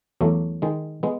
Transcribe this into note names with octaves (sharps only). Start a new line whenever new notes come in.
E2 F#3 A3
D#3 G#3
G#3 B3